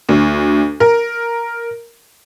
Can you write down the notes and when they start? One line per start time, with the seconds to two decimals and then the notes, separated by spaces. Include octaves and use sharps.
0.09 D2
0.80 A#4